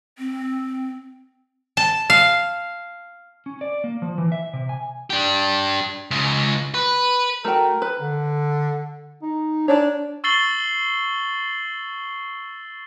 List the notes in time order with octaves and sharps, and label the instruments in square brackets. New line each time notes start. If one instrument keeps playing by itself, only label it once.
[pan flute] C4
[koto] A5
F5
[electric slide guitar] C#4
D5
A#3
F3
E3
E5
C3
G#5
[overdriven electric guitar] D4 G4
C#2 C#3
B4
[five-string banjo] A3 F#4 G5 [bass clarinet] A#4
[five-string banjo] B4
[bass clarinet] D3
D#4
[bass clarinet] D4 [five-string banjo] C#5 D5 A#5
[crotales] C#6 E6 A6 C7 F#7 G7